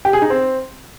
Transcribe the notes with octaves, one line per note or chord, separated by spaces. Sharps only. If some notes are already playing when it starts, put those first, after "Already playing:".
G4
G#4
D#4
C4